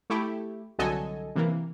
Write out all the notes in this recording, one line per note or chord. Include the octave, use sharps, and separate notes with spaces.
A3 E4 G4
C2 D3 F#3 A4 D#5 G#5
C3 E3 A#3